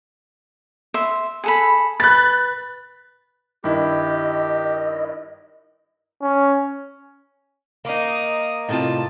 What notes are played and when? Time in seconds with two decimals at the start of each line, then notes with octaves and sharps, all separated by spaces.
0.94 E5 C6
1.44 G#4 A4 B5
2.00 B4 F#6 A6
3.64 G2 D#3 E4 G4 D#5
6.22 C#4
7.85 A#3 D#4 F5 D#6
8.69 A2 C3 F4 A5